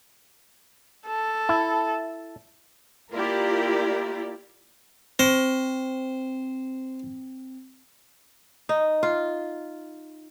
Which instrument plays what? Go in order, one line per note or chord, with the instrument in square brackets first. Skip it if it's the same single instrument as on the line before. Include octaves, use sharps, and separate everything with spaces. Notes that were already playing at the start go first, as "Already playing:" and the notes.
[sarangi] A4
[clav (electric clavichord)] E4
[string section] A#3 E4 F4 G4 A#4 D5
[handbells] C4 [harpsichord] C5
[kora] D#4
F4